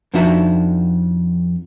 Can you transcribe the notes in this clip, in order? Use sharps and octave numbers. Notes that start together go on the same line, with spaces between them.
F2 F3 D4 D#4 F#4 E5